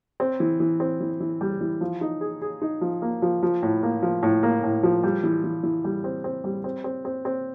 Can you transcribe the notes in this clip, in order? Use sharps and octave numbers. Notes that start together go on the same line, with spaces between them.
C4
E3
E3
C4
E3
E3
G3
E3
F3
D#4
G#4
G#4
D#4
F3
A#3
F3
F3
A2
A#3
F3
A2
A#3
A2
F3
G3
E3
E3
E3
G3
C4
C4
G3
C4
C4
C4
C4